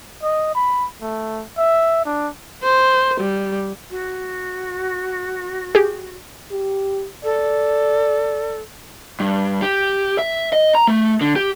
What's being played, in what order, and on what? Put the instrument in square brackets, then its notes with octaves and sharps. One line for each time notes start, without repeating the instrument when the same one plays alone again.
[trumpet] D#5
B5
A3
E5
D4
[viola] C5
G3
[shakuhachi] F#4
[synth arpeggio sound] G4 G#4
[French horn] G4
[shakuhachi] A4 [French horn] D5
[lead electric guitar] G2
G4
E5
D#5
A#5
A3
D3
G4